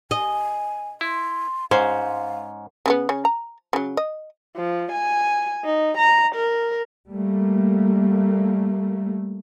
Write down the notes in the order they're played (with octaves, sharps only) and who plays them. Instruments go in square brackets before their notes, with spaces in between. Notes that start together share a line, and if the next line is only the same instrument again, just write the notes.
[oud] D#5 [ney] G#5
[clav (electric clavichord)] E4 [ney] C6
[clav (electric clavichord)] G#2 C#4 [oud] C5 [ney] F5
[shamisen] C#3 A#3 B3
C#3 C#4
A#5
C#3 F#3
D#5
[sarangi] F3
G#5
D#4
A#5
A#4
[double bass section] G3 A3 A#3